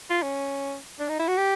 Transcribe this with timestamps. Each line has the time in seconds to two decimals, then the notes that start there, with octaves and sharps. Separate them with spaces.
0.10 F4
0.22 C#4
1.00 D4
1.09 D#4
1.19 E4
1.28 F#4
1.37 G4